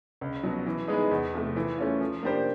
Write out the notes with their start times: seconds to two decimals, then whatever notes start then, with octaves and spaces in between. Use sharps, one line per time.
0.21 C#2
0.43 B2 F#3
0.66 E3
0.88 G#3 B3 D#4 G#4
1.11 E2
1.34 C3 F3 A3
1.56 E3
1.78 A3 C#4 F4
2.01 F3
2.23 A#3 D4 G4 C5